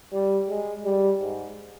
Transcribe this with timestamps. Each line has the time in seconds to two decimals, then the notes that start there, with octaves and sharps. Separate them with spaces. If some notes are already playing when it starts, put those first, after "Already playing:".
0.13 G3
0.49 G#3
0.85 G3
1.21 G#2